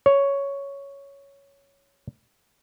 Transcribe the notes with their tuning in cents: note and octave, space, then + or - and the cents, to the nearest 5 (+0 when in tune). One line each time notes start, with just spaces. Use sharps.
C#5 +5